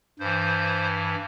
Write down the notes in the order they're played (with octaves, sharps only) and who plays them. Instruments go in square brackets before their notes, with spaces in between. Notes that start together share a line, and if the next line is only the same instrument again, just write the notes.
[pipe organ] G2 E3 C5